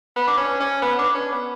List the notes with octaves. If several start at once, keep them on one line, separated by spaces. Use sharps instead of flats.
B3
D4
C#4
C#4
B3
D4
C#4
B3